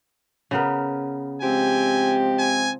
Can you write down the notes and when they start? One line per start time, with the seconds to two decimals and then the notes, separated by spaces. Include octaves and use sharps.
0.51 C#3 B3 A#4
1.42 F3 G#3 C4 G4 G#5
2.39 G#5